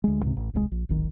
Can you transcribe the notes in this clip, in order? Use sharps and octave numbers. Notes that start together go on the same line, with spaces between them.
D2 G#3
C#2 G#2 C3
A1
D#1 C2 A2 G#3
A#1
D1 G#1 D#3